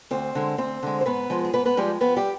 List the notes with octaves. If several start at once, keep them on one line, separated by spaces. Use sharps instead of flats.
D2 C4 C5
D3 G#3
D2 C4 C5
D3 G#3
C5
G#2 B3 B4
F3 G#3
G#4
G#2 B3 B4
B3 B4
F3 G3 G#3 G4
F2 B3 B4
G3 G4